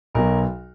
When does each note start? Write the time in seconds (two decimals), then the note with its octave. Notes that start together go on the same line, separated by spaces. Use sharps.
0.15 B1 B2 F#3 A#4